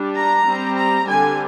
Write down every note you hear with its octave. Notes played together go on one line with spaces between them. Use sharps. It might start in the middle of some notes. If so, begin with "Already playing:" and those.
Already playing: G3 D4
A#5
G3 C4
A#5
D3 G3 C4 G#5